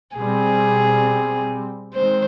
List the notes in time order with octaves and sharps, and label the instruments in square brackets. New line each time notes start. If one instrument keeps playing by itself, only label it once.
[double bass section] B2 G3 C4 [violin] G#4
[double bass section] D#3 G#3 C4 [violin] C5